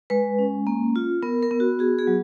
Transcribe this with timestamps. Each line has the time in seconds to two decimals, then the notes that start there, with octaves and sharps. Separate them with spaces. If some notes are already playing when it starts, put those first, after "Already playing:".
0.10 G#3 B4
0.39 C#4
0.67 A#3
0.96 F4
1.23 B3 A#4
1.43 A#4
1.51 B3
1.60 F#4
1.79 F#4 G#4
1.99 G#4
2.07 F#3